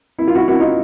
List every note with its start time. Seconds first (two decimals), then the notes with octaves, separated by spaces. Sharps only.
0.19 E4
0.27 F4
0.35 E4 F#4
0.48 E4 F#4
0.60 D#4 F4